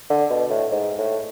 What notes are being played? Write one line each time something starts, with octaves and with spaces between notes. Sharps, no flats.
D3
B2
A2
G#2
A2